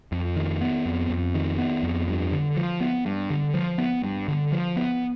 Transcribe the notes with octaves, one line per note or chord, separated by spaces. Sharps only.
F2
D#3
B3
F2
F2
D#3
B3
F2
G2
D3
F3
B3
G2
D3
F3
B3
G2
D3
F3
B3